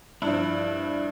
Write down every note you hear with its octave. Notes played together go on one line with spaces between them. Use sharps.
G2 F3 E4